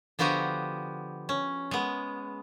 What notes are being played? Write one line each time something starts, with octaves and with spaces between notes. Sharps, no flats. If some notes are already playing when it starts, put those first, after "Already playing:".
D3 F3 B3 F#4 G4 D#5
C#4
G#3 B3